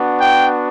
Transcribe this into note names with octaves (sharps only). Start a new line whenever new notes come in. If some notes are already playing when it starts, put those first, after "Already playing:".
Already playing: B3 D4 F#4
G5